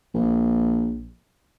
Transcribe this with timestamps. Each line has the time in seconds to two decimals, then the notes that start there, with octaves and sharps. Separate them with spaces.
0.14 A#1